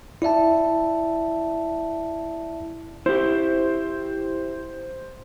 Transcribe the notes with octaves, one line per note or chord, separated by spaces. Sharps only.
E4 D5 E5 A5
E4 G4 C5